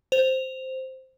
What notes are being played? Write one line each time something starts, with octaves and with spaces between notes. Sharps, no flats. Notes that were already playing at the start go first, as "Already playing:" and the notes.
C5 F7